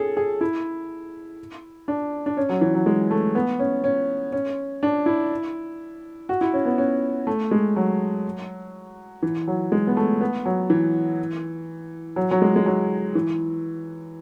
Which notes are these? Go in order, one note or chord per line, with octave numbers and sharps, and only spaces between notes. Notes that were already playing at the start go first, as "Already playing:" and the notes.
Already playing: C#4 G#4 A4
G#4
E4
D4
D4
C#4
F#3
E3
F#3
G#3
A3
B3
C#4
C#4
C#4
D4
E4
F#4
E4
C#4
B3
C#4
A3
G#3
F#3
E3
F#3
G#3
B3
A3
B3
F#3
E3
F#3
F#3
G#3
G#3
F#3
E3